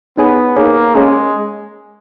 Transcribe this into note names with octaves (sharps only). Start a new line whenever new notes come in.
B3 D#4 G#4 C#5 G#5
A#3 D#4 G#4 C#5 G#5
G#3 C#4 G#4 C#5